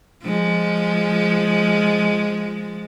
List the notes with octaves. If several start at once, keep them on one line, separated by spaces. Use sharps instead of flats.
F3 G#3